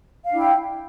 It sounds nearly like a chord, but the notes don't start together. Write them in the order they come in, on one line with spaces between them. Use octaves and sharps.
F5 D4 E4 G5